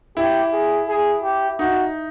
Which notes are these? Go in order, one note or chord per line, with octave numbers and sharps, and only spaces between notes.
E4 G4
G#4
G#4
G4
D#4 F#4